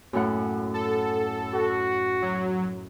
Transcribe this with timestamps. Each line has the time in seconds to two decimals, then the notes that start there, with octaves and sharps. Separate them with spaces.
0.13 F#2 A2 F#5
0.74 A4
1.54 F#4
2.22 F#3